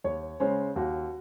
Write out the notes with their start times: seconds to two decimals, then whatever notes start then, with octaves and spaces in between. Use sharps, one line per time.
0.04 D#2 C#5
0.40 C#3 G#3 C#4 C5
0.76 D#2 F#4